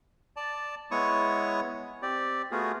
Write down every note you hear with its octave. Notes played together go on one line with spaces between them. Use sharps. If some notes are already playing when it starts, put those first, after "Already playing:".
D5 A5
G#3 B3 E4 C#5 C#6 D#6
C4 G4 D5
A3 B3 F4 F#4 G#4